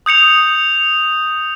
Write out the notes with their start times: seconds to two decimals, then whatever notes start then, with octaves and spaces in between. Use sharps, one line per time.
0.06 D#6 G6 C#7 F7